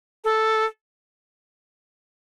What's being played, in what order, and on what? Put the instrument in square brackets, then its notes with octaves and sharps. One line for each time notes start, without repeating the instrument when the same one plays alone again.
[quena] A4